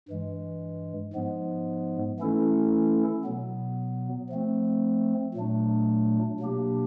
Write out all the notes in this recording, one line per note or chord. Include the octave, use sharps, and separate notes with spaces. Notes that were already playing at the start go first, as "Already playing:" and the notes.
G2 E3 G#3
G#2 F3 G#3 B3
E3 A3 C#4 E4 A4
B2 F#3 B3
F3 A3 C4
A#2 F#3 A3 D4
B2 F#3 A#3 D4 G4